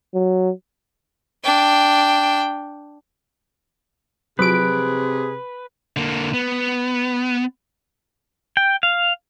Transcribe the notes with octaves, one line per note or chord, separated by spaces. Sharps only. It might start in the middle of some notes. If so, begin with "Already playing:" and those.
F#3
D4 G5
C3 F3 F#3 G#4 B4 D7
D3 A#3
B3
G5
F5